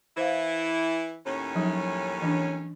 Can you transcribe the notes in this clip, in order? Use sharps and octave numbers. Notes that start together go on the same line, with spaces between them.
E3 E4 C5 F5
D#2 A2 C#4
F3 F#3 D#4
E3 D4